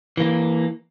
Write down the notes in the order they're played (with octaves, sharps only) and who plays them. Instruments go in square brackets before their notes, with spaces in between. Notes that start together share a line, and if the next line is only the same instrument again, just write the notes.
[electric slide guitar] E3 A#3